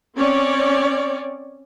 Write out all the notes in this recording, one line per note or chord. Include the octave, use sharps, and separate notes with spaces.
C4 C#4 C#5 D5